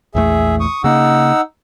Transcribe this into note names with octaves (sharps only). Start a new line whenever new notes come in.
A#1 E2 A3 G#4 E5
C#6 D#6
C#3 A#3 D#4 F#5 E6